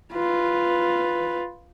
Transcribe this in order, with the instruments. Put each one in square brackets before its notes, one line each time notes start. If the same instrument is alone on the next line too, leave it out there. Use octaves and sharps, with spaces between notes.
[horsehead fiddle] F4 B4